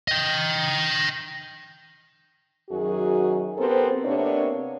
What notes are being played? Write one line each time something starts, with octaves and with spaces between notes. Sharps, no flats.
D#5 G5
F#2 D#3 F#3 F#4 G#4
B3 C4 G4 A4 A#4 C5
C3 A#3 B3 D4 C#5